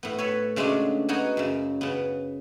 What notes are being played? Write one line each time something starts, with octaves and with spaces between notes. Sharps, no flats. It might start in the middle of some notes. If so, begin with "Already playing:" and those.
A2 B3
A4 B4 C#5
C#3 F#3 G#3 A3 C#4 D4
B3 D#4 F#4 F#5 G#5
F#2 C#3
C#3 B3